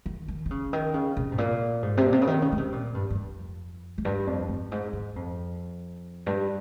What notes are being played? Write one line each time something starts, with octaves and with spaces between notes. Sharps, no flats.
D#3
D#3
D#3
C#3
D#3
C#3
C3
G#2
A#2
G#2
C3
A#2
C3
C#3
D#3
C#3
C#3
C3
A#2
G2
G2
F2
F2
G2
F2
G2
G#2
G#2
F2
G2